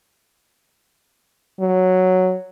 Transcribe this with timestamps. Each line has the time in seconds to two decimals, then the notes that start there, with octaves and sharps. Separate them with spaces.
1.60 F#3